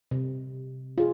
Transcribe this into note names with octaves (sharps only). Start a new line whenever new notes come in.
C3
F4 G#4